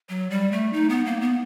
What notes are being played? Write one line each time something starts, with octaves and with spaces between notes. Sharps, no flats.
F#3
G3
A3
D#4
B3
A#3
B3